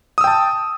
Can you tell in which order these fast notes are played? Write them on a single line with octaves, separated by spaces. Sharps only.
D#6 E6 G5 A5